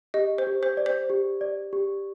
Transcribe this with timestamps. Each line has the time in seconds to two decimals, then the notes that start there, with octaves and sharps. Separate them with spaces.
0.14 G4 D#5
0.38 C5
0.47 G4
0.63 C5
0.77 D5
0.86 C5
1.10 G4
1.41 D5
1.73 G4